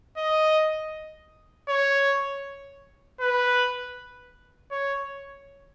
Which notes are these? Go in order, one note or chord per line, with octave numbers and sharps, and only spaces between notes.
D#5
C#5
B4
C#5